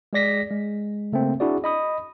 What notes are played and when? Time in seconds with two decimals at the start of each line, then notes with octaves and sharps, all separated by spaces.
0.13 G#3 G#4 D5 A#6 B6
0.51 G#3
1.12 C#3 A3 A#3 C4
1.40 D4 E4 F#4 G#4 D5
1.64 D#5 B5 D#6